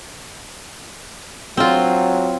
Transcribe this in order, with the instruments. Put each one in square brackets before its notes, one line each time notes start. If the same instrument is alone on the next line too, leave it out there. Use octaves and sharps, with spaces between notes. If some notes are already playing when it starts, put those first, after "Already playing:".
[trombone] F#3 [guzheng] C4 F4